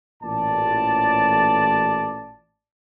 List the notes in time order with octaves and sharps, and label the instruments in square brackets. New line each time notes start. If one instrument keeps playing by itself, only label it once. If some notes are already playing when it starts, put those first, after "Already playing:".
[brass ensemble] A1 A#2 D5 A5